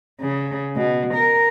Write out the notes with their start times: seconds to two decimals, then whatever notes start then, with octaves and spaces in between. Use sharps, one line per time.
0.21 C#3
0.76 B2
1.14 A#4